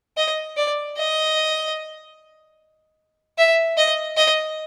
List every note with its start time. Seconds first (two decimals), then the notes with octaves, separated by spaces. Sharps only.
0.17 D#5
0.57 D5
0.97 D#5
3.38 E5
3.77 D#5
4.17 D#5